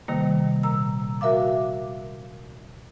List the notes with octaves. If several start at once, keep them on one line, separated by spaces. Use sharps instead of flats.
C3 D#3 G3 A#3
A#2 A#5 E6
F#4 A#4 E5 F5 D6